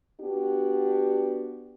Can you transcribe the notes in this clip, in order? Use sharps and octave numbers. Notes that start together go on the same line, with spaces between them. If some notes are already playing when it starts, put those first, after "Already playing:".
B3 D4 F#4 G4